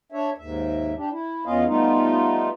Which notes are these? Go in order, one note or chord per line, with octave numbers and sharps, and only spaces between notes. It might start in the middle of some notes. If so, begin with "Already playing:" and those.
D4 C#5 E5
D#2 G#2 E5
D4 G4
E4
E2 B3 C#4 F4 D#5 F5
G3 A3 B3 D#4 F4